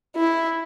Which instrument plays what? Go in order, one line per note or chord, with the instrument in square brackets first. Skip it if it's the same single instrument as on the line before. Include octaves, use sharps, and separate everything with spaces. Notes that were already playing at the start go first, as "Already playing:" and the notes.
[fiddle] E4